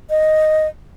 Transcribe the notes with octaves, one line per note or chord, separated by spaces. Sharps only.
D#5